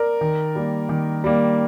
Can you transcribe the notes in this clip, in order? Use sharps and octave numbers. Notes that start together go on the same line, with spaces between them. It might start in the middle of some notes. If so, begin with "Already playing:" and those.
Already playing: A#4 D5
D#3
G3 A#3
D#3
G3 A#3